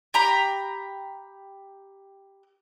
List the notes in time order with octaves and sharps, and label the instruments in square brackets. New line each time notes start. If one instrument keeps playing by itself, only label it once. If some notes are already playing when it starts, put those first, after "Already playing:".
[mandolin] G4 A#5 B5